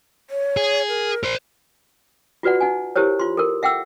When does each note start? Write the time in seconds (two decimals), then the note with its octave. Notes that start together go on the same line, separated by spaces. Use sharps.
0.30 C#5
0.57 G#4
0.88 A#4
1.23 A#4 C5
2.43 F4 F#4 B4 D5 F#5
2.61 D#4 F#5 G#5
2.96 E4 G4 A#4 C5 C#5
3.19 F4 C6
3.37 A4 A#4
3.63 E5 F#5 G5 D6 E6